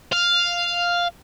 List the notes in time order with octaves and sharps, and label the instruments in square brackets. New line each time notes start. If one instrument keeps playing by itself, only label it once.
[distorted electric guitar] F5